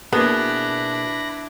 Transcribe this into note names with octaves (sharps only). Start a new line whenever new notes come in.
B2 A#3 B3 D4 E4 G#4 B5 A#6